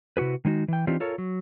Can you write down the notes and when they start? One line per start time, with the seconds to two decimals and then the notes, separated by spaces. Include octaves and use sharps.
0.17 C3 E4 F#4 G#4 B4
0.45 D#3 G#3 D#4 F#4
0.68 E3 G5
0.87 E3 C4 D4 D#4 F4 G4
1.00 F4 A4 A#4 C#5
1.18 F#3